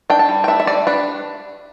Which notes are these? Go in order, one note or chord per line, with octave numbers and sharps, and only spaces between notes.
D4 G5
A5
G3
G5
D4 E5
E5
G3 D5
D4 B4